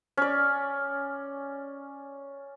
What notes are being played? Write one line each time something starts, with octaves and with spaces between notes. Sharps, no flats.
C#4 D5